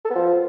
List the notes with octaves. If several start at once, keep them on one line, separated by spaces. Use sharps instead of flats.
A4
B3
F3